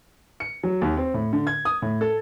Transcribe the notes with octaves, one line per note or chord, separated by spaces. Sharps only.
C#7
F#3
D#2
C4
A2
D3
G#6
D#6
A2
A4